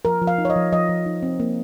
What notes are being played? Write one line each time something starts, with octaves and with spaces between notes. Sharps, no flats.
F3 A#4
F3
F5
D#4
C#5
D#5
F3
F3 D#5
F3
D#4
C4
A#3